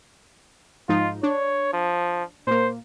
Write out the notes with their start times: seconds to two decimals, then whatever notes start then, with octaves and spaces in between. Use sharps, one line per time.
0.89 G#2 F3 D#4 F4
1.23 D4 C#5
1.73 F3
2.47 A#2 A#3 C5